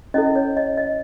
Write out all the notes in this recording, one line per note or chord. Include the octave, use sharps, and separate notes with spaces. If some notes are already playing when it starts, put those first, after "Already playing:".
C#4 E4 A4 D#5
C#5
D#5
D#5